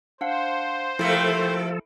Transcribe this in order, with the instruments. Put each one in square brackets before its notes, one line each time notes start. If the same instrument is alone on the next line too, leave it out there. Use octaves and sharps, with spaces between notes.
[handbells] D4 F5 F#5 [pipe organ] C5
[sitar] C3 A3 A#3 [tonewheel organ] F3 A4 [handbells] E4